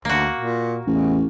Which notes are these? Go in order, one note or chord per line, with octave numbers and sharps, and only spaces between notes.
D2 A#3 F#4
A#2
A1 E2